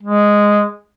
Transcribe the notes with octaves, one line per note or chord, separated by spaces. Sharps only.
G#3